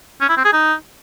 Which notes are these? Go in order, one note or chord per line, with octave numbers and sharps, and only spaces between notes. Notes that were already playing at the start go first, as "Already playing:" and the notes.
C#4
E4
C4
G#4
D#4